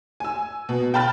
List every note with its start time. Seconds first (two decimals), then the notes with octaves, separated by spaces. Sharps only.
0.20 G#5 E6
0.69 B2
0.94 G5 A5 B5 F6 A6